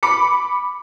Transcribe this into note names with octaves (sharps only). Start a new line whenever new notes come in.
B5 D6 C#7